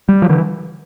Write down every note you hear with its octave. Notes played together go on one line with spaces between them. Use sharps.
G3
F3
D3 E3